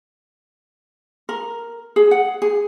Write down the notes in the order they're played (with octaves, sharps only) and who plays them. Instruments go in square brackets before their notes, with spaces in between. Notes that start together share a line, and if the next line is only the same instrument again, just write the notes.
[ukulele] A#4
G#4
F#5
G#4